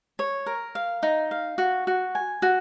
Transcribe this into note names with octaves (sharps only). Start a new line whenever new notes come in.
C#5
A#4
F5
D#4
F5
F#4
F#4
G#5
F#4